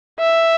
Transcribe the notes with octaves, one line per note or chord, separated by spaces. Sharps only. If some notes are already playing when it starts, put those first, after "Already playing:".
E5